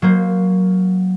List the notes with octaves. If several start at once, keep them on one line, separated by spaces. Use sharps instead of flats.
F#3 A#3 C5